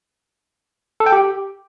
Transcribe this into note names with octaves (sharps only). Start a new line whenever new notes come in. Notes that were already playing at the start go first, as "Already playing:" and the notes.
A4
G5
G4